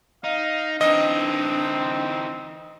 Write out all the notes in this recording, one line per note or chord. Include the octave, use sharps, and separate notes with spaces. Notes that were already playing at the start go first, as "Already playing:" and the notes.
D#4 F5
E3 C4 D4 D#4 D#5